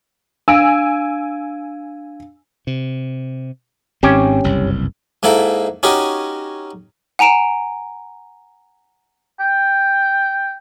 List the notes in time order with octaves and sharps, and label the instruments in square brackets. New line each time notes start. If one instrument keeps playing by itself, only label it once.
[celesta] D4 F5 D7 [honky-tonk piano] G#5 E6
[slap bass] C3
[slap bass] G#1 G#2 C4 [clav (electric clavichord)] C#4 G4
[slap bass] F#1 C2 G2
[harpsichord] G#2 A#3 E4 A4 G5
C#4 D#4 F#4 G4 A#4
[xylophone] F#5 G#5 A#5 D7 E7
[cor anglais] G5